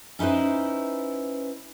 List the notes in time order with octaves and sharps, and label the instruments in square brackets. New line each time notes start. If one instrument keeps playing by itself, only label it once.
[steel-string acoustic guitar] C#4 D#4 E4 B4 C5